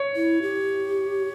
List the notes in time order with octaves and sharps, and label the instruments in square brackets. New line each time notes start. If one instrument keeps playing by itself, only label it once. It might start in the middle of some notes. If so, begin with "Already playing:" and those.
Already playing: [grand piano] C#5
[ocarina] E4
G4